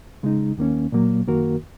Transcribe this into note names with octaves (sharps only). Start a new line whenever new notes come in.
C#3 G#3 D#4
D#2 D#3 A#3 C#4
A#2 F#3 A#3
F#2 D#3 A#3 F#4 A#4